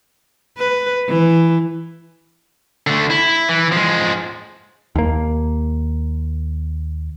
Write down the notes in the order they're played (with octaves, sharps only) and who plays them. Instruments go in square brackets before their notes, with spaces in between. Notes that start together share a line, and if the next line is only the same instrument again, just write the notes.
[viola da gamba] B4
E3
[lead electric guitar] D3 A3
E4
E3
F3 G#3
[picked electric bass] D#2 A#3